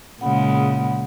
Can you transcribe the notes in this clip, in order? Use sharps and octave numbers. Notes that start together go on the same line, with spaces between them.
A#2 C#3 G#3 F#5 B5